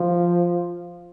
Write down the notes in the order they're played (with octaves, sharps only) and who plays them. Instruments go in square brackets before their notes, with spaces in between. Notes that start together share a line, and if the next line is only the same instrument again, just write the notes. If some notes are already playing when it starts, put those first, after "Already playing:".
Already playing: [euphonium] F3